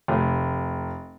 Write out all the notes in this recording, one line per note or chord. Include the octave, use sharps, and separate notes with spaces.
F1